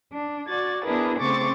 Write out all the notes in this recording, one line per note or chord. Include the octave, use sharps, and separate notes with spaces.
D4
F#4 D5 G#6 A6
B3 D4 E4 G#4 A#4 B4
C#3 A3 C4 C#6 D6 A6